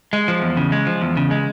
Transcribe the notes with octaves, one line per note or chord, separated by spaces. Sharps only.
G#3
F3
E2
C#3
G#3
F3
E2
C#3
G#3